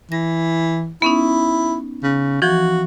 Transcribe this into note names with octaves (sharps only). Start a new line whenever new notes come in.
E3 A#6
B3 C#4 D#4 E4
C#3
E3 F3 F#4